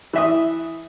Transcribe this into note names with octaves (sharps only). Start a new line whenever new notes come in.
E3 E5 D#6